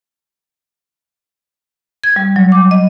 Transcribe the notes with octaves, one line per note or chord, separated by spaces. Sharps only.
G#6
G3
F#3
D6
D#5